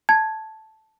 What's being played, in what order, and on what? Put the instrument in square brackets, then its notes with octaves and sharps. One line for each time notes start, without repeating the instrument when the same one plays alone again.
[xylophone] A5 G#6